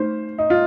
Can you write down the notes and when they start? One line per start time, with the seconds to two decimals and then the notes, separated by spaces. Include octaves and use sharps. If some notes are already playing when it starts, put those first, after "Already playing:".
Already playing: A3 D#4 C5
0.38 D#4
0.50 F4